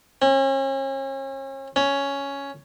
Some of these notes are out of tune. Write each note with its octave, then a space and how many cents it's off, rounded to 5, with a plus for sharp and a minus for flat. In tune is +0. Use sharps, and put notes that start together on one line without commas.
C#4 -40
C#4 +5